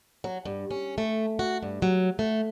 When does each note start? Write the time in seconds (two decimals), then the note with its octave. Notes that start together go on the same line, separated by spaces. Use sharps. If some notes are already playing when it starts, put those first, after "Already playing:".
0.24 F#3
0.45 G2
0.71 C#4
0.98 A3
1.39 F#4
1.63 G2
1.82 F#3
2.19 A3